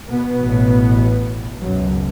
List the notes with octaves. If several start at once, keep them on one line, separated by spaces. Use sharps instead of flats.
B2 B3
A1 A2
C#2 F#2 B2 F#3